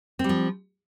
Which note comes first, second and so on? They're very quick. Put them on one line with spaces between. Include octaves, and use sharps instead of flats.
C4 G3 F3